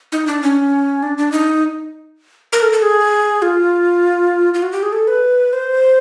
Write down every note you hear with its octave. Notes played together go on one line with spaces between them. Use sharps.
D#4
D4
C#4
D4
D4
D#4
A#4
A4
A4
G#4
F4
F4
F#4
G4
G#4
A4
B4
C5